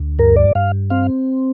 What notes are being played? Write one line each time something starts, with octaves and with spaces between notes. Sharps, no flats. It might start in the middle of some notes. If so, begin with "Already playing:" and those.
Already playing: D2
G2 A#4
D5
G2 F5
C4 F5